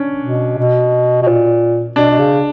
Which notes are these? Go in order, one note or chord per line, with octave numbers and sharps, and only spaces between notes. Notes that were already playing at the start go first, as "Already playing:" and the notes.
Already playing: C#4 D4
B2
B2
B2
A#2
B2 D4
B2
C#3